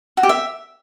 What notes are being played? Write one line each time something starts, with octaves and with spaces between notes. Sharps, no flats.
F#4
G4
E5